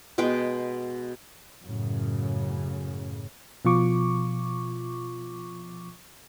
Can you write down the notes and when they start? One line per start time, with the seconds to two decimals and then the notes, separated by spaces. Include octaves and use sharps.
0.18 B2 G#3 B4 G5
1.65 F#2 A2 C#3
3.65 B2 F3 F4 C#6 D6